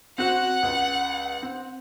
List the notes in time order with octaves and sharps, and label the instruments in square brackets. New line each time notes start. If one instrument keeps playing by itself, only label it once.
[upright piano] C4 F#4 [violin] F#5
[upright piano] C#2
C4